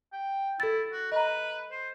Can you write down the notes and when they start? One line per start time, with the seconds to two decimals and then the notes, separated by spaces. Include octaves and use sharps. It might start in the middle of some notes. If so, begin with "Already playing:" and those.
0.12 G5
0.60 E4 A4 A6
0.92 F#4
1.12 B4 D#5 A#5
1.71 C5